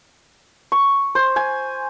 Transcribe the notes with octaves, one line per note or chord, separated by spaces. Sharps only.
C#6
C5
G#5